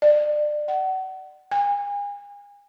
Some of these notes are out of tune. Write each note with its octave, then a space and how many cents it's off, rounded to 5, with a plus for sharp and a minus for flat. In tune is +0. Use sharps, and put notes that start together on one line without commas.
D5 +25
F#5 +30
G#5 -40